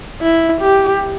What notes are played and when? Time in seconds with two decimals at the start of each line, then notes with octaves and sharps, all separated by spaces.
0.22 E4
0.62 G4